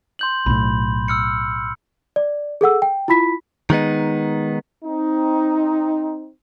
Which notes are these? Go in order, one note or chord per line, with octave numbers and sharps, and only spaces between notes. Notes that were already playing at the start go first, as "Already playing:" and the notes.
C6 G6 F#7
B1 A2 B5
E6 F6 C#7
D5
G#4 A4 F#5 E6
G5
E4 F4 B5 B6
D#3 G#3 B3 D#4
C4 D#4